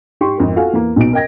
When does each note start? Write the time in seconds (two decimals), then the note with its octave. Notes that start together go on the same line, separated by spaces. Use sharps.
0.21 G#2 G4 C6 C#6
0.38 G#1 F2 A#4
0.56 F4 F#4 A4 F5 G#5
0.73 E2 A#3
0.96 B1 B2 D#4 D7
1.13 A#4 D#5 G5 G#6 A#6